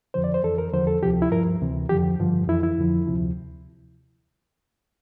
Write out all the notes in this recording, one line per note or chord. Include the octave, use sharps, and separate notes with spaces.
F2 D3 F3 C5
D5
C5
F2 E3 A4
A#4
E2 D3 F3 C5
A4
D2 C3 F3 G4
E4
G2 F3 A#4
D2 C3 E3
F2 D3 F3 G4
G2 D3 F3
F2 E3 E4
E4
F2 D3 F3
D2 C3 F3